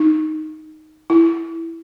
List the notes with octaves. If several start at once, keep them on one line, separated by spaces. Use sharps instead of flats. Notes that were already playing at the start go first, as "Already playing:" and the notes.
Already playing: D#4
E4